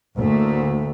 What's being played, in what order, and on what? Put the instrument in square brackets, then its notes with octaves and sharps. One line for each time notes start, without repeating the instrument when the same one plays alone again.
[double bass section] D2 [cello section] A2 A3 A#3